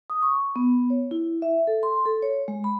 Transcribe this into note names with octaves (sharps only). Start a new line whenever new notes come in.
D#6
C#6
B3
C#5
E4
E5
A4
C6
A4
C#5
G#3
B5